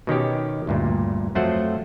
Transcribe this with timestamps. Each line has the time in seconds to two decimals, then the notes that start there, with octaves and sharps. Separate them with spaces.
0.07 B2 D#3 C#4 G4
0.67 D2 G2 A#2
1.35 F2 F#3 A3 F4 C5 F#5